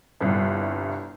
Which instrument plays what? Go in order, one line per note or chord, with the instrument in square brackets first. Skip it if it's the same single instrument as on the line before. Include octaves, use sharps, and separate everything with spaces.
[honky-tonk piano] G1 C2 G2